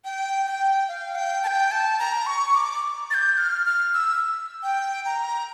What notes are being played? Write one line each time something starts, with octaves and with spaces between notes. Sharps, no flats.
G5
G5
F5
G5
A5
G5
A5
A#5
C#6
D6
A6
G6
F6
F6
E6
G5
A#5